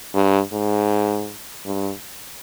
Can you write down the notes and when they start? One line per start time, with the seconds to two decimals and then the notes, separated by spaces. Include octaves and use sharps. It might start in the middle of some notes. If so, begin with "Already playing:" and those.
0.14 G2
0.52 G#2
1.65 G2